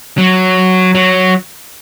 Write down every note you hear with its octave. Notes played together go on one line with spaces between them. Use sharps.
F#3
F#3